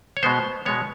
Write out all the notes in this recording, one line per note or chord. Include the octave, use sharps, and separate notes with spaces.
C#5
B2 G#3 B3 C5
B2 G#3 B3 C#5